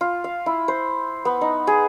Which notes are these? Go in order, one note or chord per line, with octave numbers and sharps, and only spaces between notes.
F4
F5
E4
C5
B3
D#4
G#4